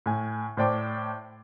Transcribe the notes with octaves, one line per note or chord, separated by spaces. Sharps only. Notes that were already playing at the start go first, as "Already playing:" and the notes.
A2 G#5
A2 C5 D5 G5 A5 D6